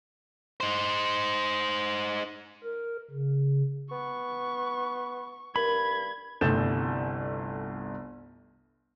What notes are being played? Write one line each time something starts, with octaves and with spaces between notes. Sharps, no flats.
D#4 C5
A#4
C#3
B3 C#6
G2 A#4 B5 G#6
G1 C2 A3 G6 A6 E7